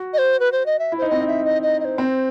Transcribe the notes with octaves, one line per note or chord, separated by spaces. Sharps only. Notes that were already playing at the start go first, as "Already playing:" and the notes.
Already playing: F#4
D#5
C5
B4
C5
D#5
E5
E4
D#4 C5
C4 D#5
D#4
E5
D#5
D#5
D#5
C5
C4